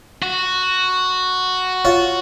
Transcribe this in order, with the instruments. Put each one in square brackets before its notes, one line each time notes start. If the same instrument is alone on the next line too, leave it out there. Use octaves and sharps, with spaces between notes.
[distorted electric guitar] F#4
[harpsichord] F4 C#5